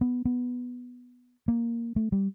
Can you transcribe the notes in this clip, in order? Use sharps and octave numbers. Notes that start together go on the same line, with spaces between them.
B3
B3
A#3
A3
G3